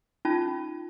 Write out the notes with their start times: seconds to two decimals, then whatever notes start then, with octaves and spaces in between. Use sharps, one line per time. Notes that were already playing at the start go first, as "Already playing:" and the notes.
0.25 C#4 D#4 F4 A5